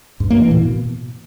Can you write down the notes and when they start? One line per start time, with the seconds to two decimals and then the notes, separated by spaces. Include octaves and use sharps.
0.20 G2
0.30 A#3
0.41 E3
0.51 A2
0.61 B2